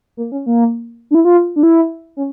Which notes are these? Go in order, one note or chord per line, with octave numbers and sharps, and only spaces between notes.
A#3
C#4
A#3
D4
E4
F4
D4
E4
C#4